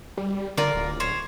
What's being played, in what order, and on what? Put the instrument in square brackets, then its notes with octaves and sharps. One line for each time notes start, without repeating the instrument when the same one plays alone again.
[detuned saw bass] G3
[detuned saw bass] D3 [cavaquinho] F4 A#4 D5
[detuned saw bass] D1
[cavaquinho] C5 C#5